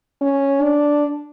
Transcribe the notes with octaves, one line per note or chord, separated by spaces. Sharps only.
C#4
D4